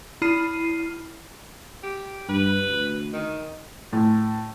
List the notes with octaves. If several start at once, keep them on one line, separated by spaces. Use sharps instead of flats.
E4 B5 F6 C7 D#7
G4
G2 B4
D2
D#3
A2